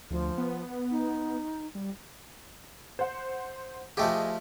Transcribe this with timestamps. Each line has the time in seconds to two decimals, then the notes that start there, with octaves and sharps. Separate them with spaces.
0.11 D2 F3
0.38 B3
0.91 D#4
1.75 G3
2.99 C5 F#5
3.97 F3 A3 G4 G#4 D#5 G5